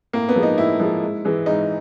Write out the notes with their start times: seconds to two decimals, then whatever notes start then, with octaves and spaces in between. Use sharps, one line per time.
0.13 A2 A#3
0.29 B3
0.36 F3 G#3
0.43 D#4
0.58 A2 E4
0.80 F3 G#3
1.02 G#2
1.25 E3 G#3
1.46 G#2 D#4